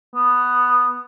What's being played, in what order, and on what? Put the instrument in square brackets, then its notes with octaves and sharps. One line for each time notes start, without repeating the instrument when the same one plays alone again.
[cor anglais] B3